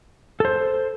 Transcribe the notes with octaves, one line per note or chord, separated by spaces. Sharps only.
A4 C5